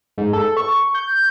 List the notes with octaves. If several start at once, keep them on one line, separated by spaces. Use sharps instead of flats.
G#2
A4
C#6
G6